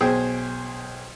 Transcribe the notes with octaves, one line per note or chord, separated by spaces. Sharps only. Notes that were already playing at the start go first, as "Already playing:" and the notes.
B1 G#4 C5 G5